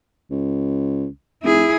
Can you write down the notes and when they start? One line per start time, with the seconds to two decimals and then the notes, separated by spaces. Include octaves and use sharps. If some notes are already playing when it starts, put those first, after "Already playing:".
0.31 C#2
1.43 F1 E4 G#4